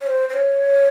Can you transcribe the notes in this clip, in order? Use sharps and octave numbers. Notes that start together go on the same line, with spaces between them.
C#5
C5
C5
C#5